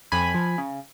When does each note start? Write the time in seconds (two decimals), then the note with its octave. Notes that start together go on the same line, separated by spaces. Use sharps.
0.12 F2 G#5 B5
0.34 F3
0.58 C#3